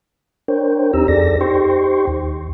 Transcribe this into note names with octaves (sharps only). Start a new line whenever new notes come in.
D4 A#4 C5 C#5 G5
D#2 C4 D#4 G4 A#5 E6
F2 G#4 A4 D5 A#6
D#4 G4 C5 G5 C6 C#6
D#2